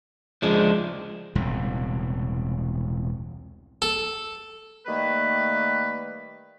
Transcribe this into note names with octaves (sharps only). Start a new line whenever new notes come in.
D2 C#3 F3 G#3 D4 D#5
E1 C2 A2 C#3
A4
D#3 G3 A3 A#3 B4